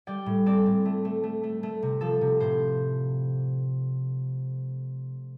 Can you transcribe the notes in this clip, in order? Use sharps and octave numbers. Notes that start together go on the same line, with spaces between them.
G3 D5 G5
A2
C4 A4 D5
A2
A3
A3
A3
A3
A3
C3
F3 A4
C3
A2 C5